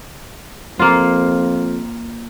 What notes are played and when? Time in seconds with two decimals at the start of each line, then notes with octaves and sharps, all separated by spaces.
0.79 F2 A#3 F4